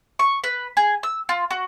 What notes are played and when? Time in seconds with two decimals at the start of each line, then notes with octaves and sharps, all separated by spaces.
0.19 C#6
0.44 B4
0.77 G#4
1.03 E6
1.29 F4
1.51 F#4